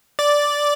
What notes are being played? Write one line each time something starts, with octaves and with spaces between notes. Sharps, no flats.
D5